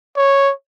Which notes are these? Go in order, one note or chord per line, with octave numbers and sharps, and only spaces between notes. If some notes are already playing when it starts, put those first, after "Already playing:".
C#5